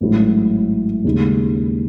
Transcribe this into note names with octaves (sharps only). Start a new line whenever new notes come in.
A1 G#2 F#3 A3 E4
D#2 C#3 G#3 D#4